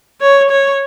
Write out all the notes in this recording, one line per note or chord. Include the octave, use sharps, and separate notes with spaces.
C#5
C#5